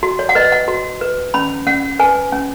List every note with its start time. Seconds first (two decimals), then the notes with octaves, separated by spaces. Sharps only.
0.03 F#4
0.19 C#5
0.29 F#5
0.35 B4 D#5
0.52 F#5
0.68 F#4
1.01 B4
1.34 C#4 B5
1.67 C#4 F#5
1.99 B4 G#5
2.32 C#4